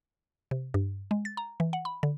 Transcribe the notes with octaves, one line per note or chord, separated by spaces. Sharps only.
C3
G2
G#3
A6
A#5
E3
F#5
B5
D3